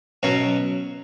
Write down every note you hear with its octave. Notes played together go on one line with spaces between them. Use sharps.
B2 F#3 C#4